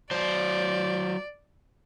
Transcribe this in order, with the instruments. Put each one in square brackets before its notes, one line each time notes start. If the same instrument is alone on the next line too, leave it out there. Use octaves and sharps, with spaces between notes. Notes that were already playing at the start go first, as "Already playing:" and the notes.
[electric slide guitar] F#3 C5 [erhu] D5